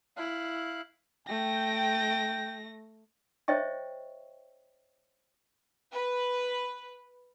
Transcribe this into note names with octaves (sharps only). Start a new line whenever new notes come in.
E4 F5 F#6
A3 G5 A#6
C5 C#5 D#5 E5 G5 C#6
B4